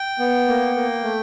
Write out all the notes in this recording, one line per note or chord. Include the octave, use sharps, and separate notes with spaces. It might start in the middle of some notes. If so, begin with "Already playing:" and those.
Already playing: G5
B3
A#3
A#3
A3